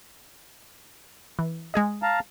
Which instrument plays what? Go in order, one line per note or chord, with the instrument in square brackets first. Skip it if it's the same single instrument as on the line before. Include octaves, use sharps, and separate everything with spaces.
[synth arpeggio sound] E3
G#3 G#4 D#5
[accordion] F5 A5 A#5